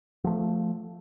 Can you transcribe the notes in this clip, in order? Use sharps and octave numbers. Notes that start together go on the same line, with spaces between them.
F3 A3